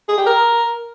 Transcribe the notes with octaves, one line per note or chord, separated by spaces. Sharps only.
G#4
G4
A#4